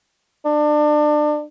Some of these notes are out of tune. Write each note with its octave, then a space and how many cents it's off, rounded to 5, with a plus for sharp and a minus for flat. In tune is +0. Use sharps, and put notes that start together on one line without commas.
D4 +30